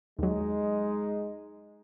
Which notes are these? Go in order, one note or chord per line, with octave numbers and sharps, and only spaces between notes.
D#2 F#3 G#3 D#4